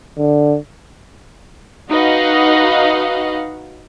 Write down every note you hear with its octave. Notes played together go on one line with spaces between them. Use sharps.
D3
D#4 F#4 B4 D#5 F5 F#5